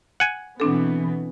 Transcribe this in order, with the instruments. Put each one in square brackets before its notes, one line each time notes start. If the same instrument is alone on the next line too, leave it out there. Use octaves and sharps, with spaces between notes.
[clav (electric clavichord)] F#5 G#5
[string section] B2 E3 B3 [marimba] C4 D4 A4